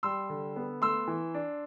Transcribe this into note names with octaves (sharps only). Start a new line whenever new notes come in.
G3 C6 E6
D3
B3
A3 C6 E6
E3
D4